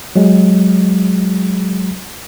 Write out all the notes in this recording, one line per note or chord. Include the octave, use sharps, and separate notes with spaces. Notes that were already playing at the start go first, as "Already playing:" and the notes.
F#3 G#3